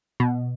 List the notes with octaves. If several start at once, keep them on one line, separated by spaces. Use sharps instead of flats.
B2